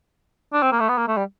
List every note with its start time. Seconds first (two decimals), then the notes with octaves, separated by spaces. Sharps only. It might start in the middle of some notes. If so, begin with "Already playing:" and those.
0.53 D4
0.62 C4
0.72 A#3
0.80 A3
0.89 B3
0.98 A#3
1.08 A3
1.17 G3